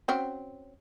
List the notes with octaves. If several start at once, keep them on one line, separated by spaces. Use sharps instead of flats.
C4 C#4 F#4